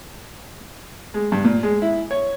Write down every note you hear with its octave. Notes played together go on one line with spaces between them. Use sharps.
G#3
G2
A#2
G#3
E4
C#5